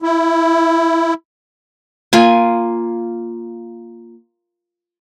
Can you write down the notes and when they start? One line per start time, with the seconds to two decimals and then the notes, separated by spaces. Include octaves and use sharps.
0.02 E4
2.13 A#3 F4 G#5